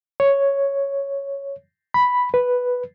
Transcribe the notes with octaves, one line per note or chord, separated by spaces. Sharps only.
C#5
B5
B4